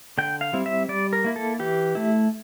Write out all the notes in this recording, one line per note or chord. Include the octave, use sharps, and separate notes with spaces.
D3 G5
F5
G3 C4 E4
E5
G3 D5
A#4
A#3 E4
A4
E3 G4
A3 E4